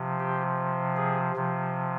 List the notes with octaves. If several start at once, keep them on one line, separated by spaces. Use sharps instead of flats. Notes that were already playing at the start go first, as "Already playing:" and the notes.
Already playing: C3 F3
G4
G#4
C3 F3